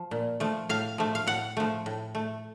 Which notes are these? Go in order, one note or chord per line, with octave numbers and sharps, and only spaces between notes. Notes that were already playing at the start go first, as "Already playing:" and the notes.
Already playing: F3
A#2
F3 A3
A2 F5
F3 A3
F5
A2 F#5
F3 A3
A2
A3